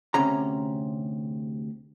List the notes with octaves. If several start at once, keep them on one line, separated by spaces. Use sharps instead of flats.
D2 C3 C#4 A#5